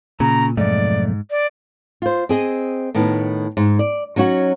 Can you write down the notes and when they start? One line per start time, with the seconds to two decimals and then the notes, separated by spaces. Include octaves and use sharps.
0.20 A#2 C#3 A#5
0.57 B1 F2 G#2 A3 D5
1.31 D5
2.02 F4 C5
2.29 C4 G#4 D#5
2.95 A2 D#3 B3
3.57 G#2
3.79 D5
4.16 F#3 C#4 D#4 F#4 F#5